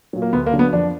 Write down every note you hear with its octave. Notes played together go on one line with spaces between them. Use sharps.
A#2 F#3
A#3
D2 B3
A#3
D3 F#3
B3
F2 D4